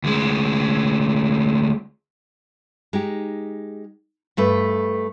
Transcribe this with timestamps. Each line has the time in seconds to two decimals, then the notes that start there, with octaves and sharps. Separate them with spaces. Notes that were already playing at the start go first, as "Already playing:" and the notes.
0.04 D2 G#3
2.93 G#3 D#4 G4
4.37 G2 A3 B4